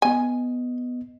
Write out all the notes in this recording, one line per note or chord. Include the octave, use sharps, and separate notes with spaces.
B3 D#5 G#5